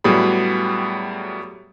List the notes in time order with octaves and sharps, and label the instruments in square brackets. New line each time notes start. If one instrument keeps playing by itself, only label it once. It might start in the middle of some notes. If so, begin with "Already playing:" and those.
[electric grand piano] A2 F#3 G3 B3 G#4 B5